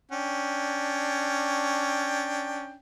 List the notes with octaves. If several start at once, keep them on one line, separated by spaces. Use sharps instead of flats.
C#4 D4 G5